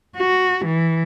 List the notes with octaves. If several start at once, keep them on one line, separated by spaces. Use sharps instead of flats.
F#4
E3